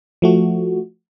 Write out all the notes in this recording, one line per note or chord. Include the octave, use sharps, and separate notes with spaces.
F3 A3 F#4